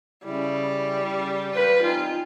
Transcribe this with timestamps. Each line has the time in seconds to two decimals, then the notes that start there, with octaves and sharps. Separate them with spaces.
0.25 C#3 G3 E4
1.12 C#3
1.54 B4 C5 F5
1.83 C4 D#4 F4 G#5